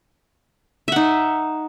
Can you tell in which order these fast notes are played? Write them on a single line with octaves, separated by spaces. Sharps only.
E5 F#5 D#4